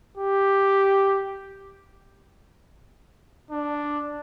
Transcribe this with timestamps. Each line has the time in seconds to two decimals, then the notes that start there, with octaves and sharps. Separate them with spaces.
0.17 G4
3.51 D4